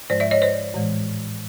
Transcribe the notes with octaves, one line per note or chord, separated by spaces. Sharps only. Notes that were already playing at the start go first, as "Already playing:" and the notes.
G#2 F3 G#3 C5 D5
D5 E5
C#5 D#5
C5 D5
A2 E3 G#3